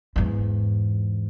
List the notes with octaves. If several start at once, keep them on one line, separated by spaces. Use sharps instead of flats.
E2 G#2